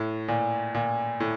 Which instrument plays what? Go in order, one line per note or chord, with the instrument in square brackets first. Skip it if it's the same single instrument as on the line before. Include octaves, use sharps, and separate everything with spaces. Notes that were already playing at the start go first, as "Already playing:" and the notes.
Already playing: [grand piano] A2
A#2
A#2
A2